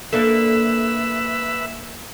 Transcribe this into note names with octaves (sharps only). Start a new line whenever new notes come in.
A#3 D4 A4 B4 E5